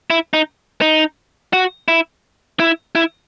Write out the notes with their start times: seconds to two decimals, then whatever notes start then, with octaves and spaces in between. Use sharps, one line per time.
0.10 E4
0.33 D#4
0.81 D#4
1.53 F#4
1.88 E4
2.60 E4
2.95 E4